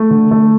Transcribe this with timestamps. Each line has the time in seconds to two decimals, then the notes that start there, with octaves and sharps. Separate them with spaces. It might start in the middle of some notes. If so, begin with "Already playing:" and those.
Already playing: A3
0.11 D3
0.31 A3